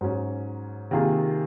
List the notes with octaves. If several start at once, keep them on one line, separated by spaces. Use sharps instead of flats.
G#2 F#3 C#4
C3 D#3 A#3 F4 G#4